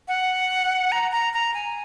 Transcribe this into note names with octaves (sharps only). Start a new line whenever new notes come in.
F#5
A#5
A#5
A#5
G#5